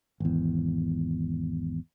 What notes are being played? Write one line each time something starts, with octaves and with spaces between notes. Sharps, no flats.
G#1 E2